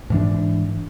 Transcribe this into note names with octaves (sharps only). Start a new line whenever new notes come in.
G#2 E3 D4